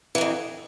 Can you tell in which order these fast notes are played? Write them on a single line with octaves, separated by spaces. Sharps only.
E3 F#3 F2